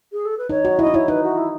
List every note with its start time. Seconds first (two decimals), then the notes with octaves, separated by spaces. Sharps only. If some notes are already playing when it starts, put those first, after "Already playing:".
0.13 G#4
0.25 A4
0.38 B4
0.49 D#4 C#5
0.65 F#4
0.79 E4 D#5
0.87 D#4
0.94 E4 C#5
1.08 D#4 B4
1.23 F#4
1.38 E4